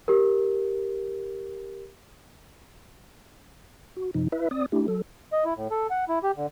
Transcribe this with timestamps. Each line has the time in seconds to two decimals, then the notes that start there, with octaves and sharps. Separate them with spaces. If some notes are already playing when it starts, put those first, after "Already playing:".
0.08 G4 A#4
3.97 F#4
4.14 F#2 C3 F3 D#4
4.32 E4 B4 E5
4.51 C4 D5 D#6
4.72 A3 D4 E4 G4
4.88 F#3 A4
5.33 D#5
5.45 E4
5.56 A2
5.71 A4
5.90 F#5
6.09 E4
6.23 G4
6.37 D3